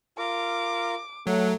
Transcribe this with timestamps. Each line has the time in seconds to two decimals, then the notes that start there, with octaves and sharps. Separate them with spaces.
0.18 F4 A#4 D6
1.27 F#3 A3 F#5